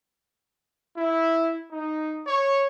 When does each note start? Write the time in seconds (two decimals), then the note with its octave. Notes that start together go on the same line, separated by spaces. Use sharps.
0.95 E4
1.70 D#4
2.26 C#5